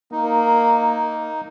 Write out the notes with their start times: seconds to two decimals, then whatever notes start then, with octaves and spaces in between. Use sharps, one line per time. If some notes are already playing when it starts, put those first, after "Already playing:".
0.12 A#3 D#4